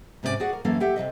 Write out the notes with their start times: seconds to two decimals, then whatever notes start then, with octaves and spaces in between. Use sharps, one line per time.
0.23 G#2 C3 C#4 D4 D5 G#5
0.40 F#4 G#4 D5 F#5
0.53 A#4
0.65 F#2 E3 A#3 C#4 A4 F5
0.80 G4 E5 F#5
0.96 C3 D#3 C4 D#5